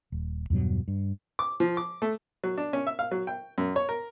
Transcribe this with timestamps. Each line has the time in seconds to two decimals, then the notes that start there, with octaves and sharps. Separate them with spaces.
0.12 D#1
0.50 E2 G2 B2 F#3
0.88 G2
1.39 D6
1.60 F3
1.77 D6
2.02 A3
2.44 F#3
2.58 D4
2.73 C#4
2.87 E5
2.99 F5
3.11 F#3
3.27 G5
3.58 F#2
3.76 C#5
3.89 A#4